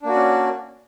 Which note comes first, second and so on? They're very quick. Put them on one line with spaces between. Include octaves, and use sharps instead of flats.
D4 A#3 F#4 D5 C#4